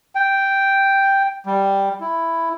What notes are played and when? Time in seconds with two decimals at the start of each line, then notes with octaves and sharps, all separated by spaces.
0.15 G5
1.46 G3
2.00 E4